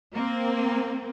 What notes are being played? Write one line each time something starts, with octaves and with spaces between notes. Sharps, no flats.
A#3 C4